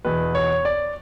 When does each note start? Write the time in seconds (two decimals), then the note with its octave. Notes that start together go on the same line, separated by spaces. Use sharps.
0.05 E2 B2 B4
0.35 C#5
0.65 D5